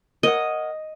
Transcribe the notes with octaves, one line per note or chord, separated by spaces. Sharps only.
A#4 C#5 D#5 F#5